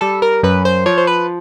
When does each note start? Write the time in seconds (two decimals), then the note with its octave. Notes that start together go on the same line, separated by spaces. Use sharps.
0.01 G3 A4
0.22 A#4
0.43 F#2 B4
0.65 C5
0.86 F3 C#5
0.98 C5
1.07 B4